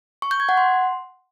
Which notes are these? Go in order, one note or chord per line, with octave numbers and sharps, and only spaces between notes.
C#6
G6
G#6
F#5
C6